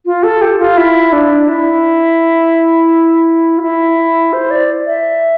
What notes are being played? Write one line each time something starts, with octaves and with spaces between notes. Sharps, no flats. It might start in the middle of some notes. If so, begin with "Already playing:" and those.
F4
A4
G4
F4
E4
D4
E4
F4
E4
C5
D5
E5